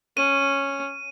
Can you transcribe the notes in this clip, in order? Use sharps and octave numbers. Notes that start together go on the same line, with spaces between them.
C#4 D#7